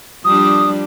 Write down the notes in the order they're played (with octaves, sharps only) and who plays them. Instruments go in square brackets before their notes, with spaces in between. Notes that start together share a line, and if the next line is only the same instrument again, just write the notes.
[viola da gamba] F3 G3 D4 [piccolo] D#6